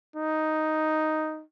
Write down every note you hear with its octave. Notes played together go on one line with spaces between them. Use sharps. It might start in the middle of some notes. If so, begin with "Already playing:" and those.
D#4